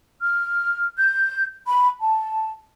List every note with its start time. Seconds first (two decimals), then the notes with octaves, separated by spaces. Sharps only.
0.21 F6
0.97 G6
1.66 B5
2.00 A5